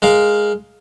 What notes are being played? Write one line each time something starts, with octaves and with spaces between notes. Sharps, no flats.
G#3 A#4 F5